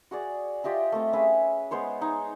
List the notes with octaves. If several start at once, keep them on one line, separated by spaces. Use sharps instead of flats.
F#4 G#4 D5
F4 G4 D#5 E5
A3 C4
C#4 G#4 B4 E5
G#3 B3 C5 C#5
D#4 G#5